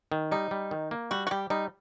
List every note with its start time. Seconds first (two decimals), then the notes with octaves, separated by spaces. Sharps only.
0.12 D#3
0.32 G3 D#4
0.51 G3
0.71 D#3
0.91 A#3
1.11 G3 F#4
1.27 F#4
1.31 G3 G4
1.50 G3 D#4